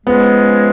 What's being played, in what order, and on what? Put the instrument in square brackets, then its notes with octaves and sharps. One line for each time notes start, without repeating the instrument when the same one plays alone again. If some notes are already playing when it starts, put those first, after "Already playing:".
[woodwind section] C#3 F3 G#3 [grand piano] B3